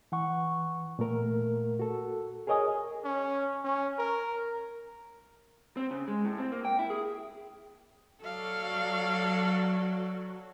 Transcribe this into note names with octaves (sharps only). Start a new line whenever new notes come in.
E3 F#5 C#6
A#2 A3 A#4
F#4 A4
G#4 A#4 C#5 D#5 G#5 D#6
C#4
C#4
A#4
C4
C#3
G#3
A2
C4
A#3
G5
E4
G#4
F#3 F#4 A4 D5 F5